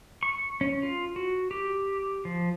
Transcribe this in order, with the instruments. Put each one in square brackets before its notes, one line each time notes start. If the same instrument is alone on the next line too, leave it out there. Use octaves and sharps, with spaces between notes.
[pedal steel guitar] C#6
C#4
F4
F#4
G4
F3